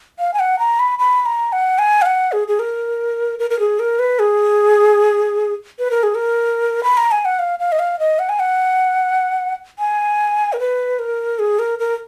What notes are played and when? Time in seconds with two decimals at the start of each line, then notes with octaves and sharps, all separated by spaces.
0.19 F5
0.34 G#5
0.39 F#5
0.59 A#5
0.79 B5
0.99 B5
1.26 A#5
1.52 F#5
1.79 G#5
2.02 F5
2.06 F#5
2.32 G#4
2.48 G#4
2.59 A#4
3.39 A#4
3.50 A#4
3.59 G#4
3.79 A#4
3.99 B4
4.19 G#4
5.79 B4
5.91 A#4
6.03 G#4
6.15 A#4
6.84 B5
6.97 A#5
7.11 G#5
7.25 F#5
7.39 F5
7.59 F5
7.72 D#5
7.79 F5
7.99 D#5
8.19 F#5
8.29 G#5
8.39 F#5
9.79 G#5
10.53 A#4
10.59 B4
10.99 A#4
11.39 G#4
11.59 A#4
11.79 A#4